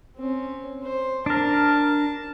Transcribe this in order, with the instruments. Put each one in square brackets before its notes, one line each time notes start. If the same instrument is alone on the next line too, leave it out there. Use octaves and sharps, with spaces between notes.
[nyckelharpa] C4 C#4
C5
[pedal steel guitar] D4 A#4 [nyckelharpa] A5